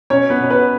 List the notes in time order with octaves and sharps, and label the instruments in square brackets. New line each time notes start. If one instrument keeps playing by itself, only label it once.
[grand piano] B2 C#4 C#5
B3 B4
B2 C#5
B3 B4